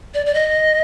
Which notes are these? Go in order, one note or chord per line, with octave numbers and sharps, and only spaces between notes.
D5
D5
D#5